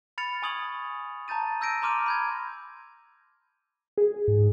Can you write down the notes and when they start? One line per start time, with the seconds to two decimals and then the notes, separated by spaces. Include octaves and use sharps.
0.18 B5 F6 A6 C#7 F7
0.42 G#5 C#6 D#6 G#6 F#7
1.28 A5 A#5 G6 A6 D#7
1.61 E6 G6 A#6 D7 D#7
1.82 A#5 C6 D6 F6 D#7 F7
2.06 B5 G6 G#6
3.98 G#4
4.28 G#2